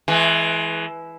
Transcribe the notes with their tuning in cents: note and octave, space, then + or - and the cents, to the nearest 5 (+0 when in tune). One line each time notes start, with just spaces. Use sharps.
E3 +0 G#3 +30